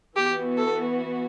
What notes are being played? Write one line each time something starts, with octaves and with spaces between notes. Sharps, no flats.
E3 B3 F#4 G4
A4